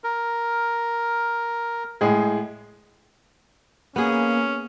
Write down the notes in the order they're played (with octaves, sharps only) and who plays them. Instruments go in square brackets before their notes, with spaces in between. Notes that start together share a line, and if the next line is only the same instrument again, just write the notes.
[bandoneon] A#4
[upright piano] A2 G#3 G#4
[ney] A#3 [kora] B3 G#4 [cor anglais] C#4